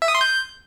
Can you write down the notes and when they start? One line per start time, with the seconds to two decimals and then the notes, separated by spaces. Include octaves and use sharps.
0.02 E5
0.08 D#6
0.15 C6
0.21 G6